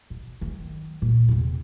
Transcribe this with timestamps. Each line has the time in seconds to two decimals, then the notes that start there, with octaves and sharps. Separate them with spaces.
0.10 B2
0.41 D#3 F#3
1.02 A#2
1.28 E2 C3